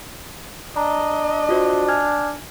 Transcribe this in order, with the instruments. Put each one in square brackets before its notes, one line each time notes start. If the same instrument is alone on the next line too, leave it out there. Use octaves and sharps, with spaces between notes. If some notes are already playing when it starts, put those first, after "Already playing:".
[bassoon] D4 [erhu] D#5 [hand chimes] A#5
[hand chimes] F4 F#4 C5
G#5 F6 G#6